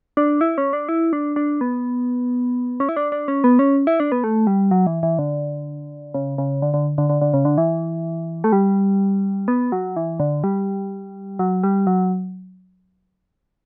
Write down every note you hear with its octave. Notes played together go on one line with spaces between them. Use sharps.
D4
E4
C#4
D4
E4
D4
D4
B3
C#4
E4
D4
D4
C#4
B3
C#4
E4
D4
B3
A3
G3
F#3
E3
E3
D3
C#3
C#3
D3
D3
D3
D3
D3
C#3
D3
E3
A3
G3
B3
F#3
E3
D3
G3
F#3
G3
F#3